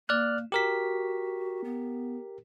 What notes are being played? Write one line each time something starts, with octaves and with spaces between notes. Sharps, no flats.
A#3 D5 F6 F#6
F#4 G4 A#4 B6
B3